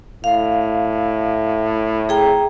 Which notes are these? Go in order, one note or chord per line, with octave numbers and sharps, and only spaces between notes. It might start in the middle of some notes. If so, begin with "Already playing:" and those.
A2 F5
G#4 G5 A#5